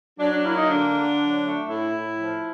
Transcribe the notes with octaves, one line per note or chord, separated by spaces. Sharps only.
F#3 D4
D4
A#3 E4
D#4
D3 D4
D3
F#3
A3
A2 E4
A2
F3